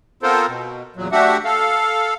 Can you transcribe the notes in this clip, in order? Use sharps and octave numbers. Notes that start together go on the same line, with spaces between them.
B3 C4 F4 A4 A#4 C5
B2
E2 A#2 F#3
A3 D4 F#4 G4 E5 F#5
A4 F5